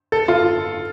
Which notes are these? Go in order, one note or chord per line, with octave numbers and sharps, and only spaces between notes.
A4
F4